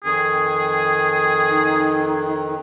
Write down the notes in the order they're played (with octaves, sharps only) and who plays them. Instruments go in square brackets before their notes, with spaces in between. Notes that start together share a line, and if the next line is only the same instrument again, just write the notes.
[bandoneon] F2 D#3 [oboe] G#4
[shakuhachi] D#4